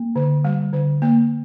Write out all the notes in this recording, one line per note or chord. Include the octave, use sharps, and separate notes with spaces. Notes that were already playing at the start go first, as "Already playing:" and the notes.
Already playing: A#3
D3
G3
D3
A#3